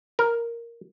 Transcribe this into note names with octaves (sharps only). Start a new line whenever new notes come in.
A#4